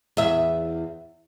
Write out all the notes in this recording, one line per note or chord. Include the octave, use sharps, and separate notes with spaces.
E2 E5